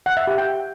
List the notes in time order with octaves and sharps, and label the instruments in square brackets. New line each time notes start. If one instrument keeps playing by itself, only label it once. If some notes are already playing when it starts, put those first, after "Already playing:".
[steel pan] F#5
E5
G4
G5